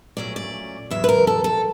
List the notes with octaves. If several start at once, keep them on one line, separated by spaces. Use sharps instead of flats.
A#2 F#3 A3 C#4 D5
D5
E2 C#3 F#3 E5
B4
A#4
A4
A4